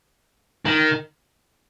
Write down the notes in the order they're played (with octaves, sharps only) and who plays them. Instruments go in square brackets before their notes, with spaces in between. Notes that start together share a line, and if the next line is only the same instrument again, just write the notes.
[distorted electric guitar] D#3